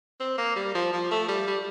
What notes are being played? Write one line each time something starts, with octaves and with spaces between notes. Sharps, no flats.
C4
A#3
G3
F3
F3
A3
G3
G3